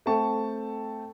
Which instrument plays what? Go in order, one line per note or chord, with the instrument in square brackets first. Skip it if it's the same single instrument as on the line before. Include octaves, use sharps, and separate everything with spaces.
[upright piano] A3 C4 A4 G5 A5 C#6